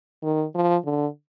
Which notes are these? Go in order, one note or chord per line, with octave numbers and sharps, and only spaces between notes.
D#3
F3
D3